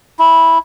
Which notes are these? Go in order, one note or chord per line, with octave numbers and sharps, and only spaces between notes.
E4